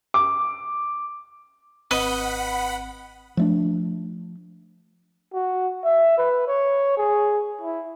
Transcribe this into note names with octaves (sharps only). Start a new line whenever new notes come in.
D6
G#1 C4 B4 D#5 F#5 B5
F3 A3 D4
F#4
E5
B4
C#5
G#4
E4